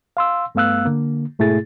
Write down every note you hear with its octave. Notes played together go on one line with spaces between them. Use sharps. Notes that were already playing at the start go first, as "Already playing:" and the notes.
F5 C6 E6
G2 A3 B3 F5 E6 F#6
D3 A#3
G#2 B2 A3 E4 G#4 A6